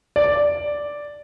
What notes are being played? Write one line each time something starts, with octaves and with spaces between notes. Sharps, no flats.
D5